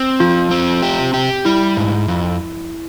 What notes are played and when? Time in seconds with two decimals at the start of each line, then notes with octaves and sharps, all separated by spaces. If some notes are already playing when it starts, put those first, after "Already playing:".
Already playing: C4
0.20 F3 F4
0.51 C4
0.82 G4
1.14 G4
1.45 G3 E4
1.77 G#2
2.08 F2